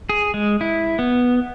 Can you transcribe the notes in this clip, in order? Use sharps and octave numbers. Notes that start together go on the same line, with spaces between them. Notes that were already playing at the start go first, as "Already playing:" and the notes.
G#4
G#3
E4
B3